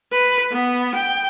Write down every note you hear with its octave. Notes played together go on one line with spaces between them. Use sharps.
B4
B3
G5